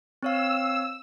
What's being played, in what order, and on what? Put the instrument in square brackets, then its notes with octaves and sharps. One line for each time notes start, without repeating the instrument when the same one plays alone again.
[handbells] C4 C#5 F5 [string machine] E6